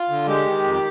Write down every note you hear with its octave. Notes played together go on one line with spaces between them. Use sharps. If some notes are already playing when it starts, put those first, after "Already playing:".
Already playing: F4
D3
G#3 G4
D#3
F2